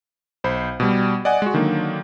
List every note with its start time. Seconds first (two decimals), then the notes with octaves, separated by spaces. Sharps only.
0.44 B1 C5 B5
0.80 B2 G3
1.25 D5 D#5 F#5 G#5
1.42 G#3 F#4
1.54 D3 D#3 F#3 A#3